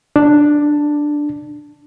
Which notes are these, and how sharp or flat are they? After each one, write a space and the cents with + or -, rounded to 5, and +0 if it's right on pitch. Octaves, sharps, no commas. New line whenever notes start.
D4 +5